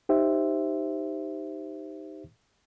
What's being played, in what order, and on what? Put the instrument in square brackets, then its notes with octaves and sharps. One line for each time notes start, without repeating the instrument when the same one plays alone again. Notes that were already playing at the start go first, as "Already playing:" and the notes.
[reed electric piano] D#4 G4 C5 E5